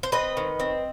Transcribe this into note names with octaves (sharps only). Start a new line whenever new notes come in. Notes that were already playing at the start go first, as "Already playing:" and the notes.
C5
C4 B4 D#5
D#3
C4